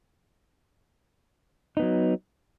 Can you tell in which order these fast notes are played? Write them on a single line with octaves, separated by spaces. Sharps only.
D#4 B3 F#3